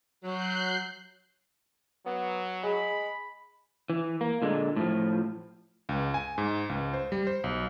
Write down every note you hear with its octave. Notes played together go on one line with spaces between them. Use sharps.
F#3 F#6 G6 C7
F#3 B3
G#3 G#4 B5
E3
A#3
A#2 D3 G#3
A2 F3
C#2
G#5
G#2
C#2
C5
G3
C5
B1